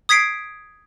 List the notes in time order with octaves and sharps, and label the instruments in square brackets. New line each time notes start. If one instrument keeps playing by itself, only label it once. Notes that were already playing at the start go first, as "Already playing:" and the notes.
[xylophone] D#6 G#6 B6 C7 D7